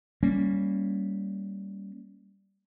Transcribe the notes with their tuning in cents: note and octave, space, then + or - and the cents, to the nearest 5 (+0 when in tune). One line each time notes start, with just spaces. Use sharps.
G3 +0 A#3 +0 C#4 +5